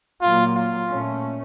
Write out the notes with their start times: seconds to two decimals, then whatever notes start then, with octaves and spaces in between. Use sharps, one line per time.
0.22 A#2 F#3 A#3 F4
0.55 F4
0.88 A#2 A3 C#4